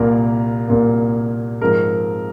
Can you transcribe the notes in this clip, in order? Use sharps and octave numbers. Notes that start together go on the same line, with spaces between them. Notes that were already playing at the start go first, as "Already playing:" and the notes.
Already playing: C2 A#2 A#3 A#4
C2 A#2 A#3
G#2 F3 C4 A#4